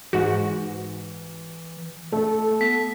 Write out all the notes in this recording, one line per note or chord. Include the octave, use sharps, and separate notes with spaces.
G#2 E3 F#4
A3 A4
B3 B6